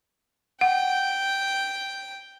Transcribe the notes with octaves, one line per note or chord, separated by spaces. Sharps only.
F#5 G5